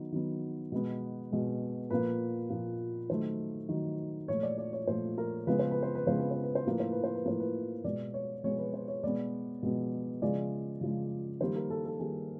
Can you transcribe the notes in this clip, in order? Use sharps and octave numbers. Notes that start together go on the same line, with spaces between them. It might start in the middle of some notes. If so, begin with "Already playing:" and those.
Already playing: D#3 F#3 B3
D#3 F#3 B3
B2 G#3 B3
B2 G#3 B3
A#2 F3 A#3 B4
A#2 F3 A#3
D#3 F#3 A3 C5
D#3 F#3 A3
A#2 F3 A3 C#5
D5
D5
C#5
A#2 F3 A3 C5
A#4
C#3 F3 G#3 B3 B4
C5
B4
C5
B4
C#3 F3 G#3 B3 C5
B4
C5
B4
C5
A2 F3 A#3 B4
C5
B4
C5
B4
A2 F3 A#3 C5
B4
B2 G#3 B3 D5
C#5
B2 G#3 B3 C#5
B4
C5
C#5
B2 G#3 B3 D5
B2 G#3 B3
C#3 F3 G#3 D5
C#3 F3 G#3
D#3 G3 A#3 C5
A#4
A4
A4
D#3 G3 A#3 G#4